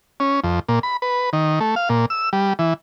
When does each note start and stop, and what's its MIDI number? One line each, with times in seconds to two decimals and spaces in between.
0.20 0.40 61
0.44 0.60 41
0.68 0.79 46
0.83 0.97 83
1.02 1.30 71
1.33 1.59 51
1.60 1.75 57
1.76 1.89 77
1.89 2.06 46
2.10 2.29 88
2.33 2.53 55
2.59 2.74 52